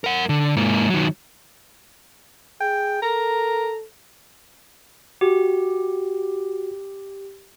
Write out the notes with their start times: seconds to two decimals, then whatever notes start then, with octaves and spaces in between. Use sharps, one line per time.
0.04 A#4 F#5
0.29 D3
0.57 G#2 A#3
0.90 D#3 F#3
2.61 G#4 G5
3.02 A4 A#4 A#5
5.21 F#4 G4